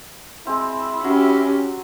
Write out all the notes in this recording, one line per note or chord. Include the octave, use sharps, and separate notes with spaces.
G#3 C4 E4
F#3 C#4 G4